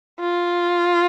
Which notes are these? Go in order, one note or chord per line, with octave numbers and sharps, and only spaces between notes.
F4